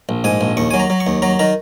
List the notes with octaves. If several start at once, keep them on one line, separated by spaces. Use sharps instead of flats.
A#1
G#2 G#5
A#1
D#2 C#6
F#3 G#5
A#5
F#3
C#6
D#2
F#3 A#5
D#3 A#5